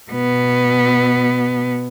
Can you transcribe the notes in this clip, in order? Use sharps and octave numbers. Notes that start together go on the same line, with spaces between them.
B2 B3